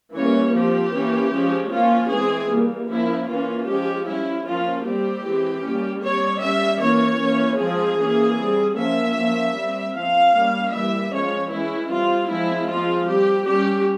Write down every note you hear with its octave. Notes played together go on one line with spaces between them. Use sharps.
E3 G3 A#3 C#4 C#5
F3 C4 G4
E3 A#3 C#4
F3 G#3 C#4
F3 A#3 C#4 F4
E3 G#3 C4 G#4
E3 G3 A#3
F3 A#3 C#4 E4
E3 A#3 C#4 F4
F3 G#3 C#4 G4
G3 C#4 E4
F3 A#3 C#4 F4
G3 C4 G4
E3 G#3 C4
G3 A#3 C#4
G3 C4 C#5
G3 C#4 E5
E3 A#3 C#4 C#5
E3 A#3 C#4
F3 G#3 C4 G#4
E3 A#3 C#4
G3 C4
F3 A#3 C#4 E5
F3 A#3 C#4
G3 C4
F3 C4 F5
G3 A#3 C#4
E3 G3 A#3 E5
F3 G#3 C#4 C#5
E3 G#3 C#4 E4
G3 C4 F4
F3 G#3 C4 E4
F3 G#3 C4 F4
G3 C4 G4
G3 C#4 G4